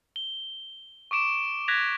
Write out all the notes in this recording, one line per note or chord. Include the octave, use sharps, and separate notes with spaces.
G7
C#6 D6 D7 E7
F#6 G#6 A#6 B6 F7